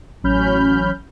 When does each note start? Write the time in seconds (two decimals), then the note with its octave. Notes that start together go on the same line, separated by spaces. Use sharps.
0.23 A1 F#3 C#4 B5 F6 G6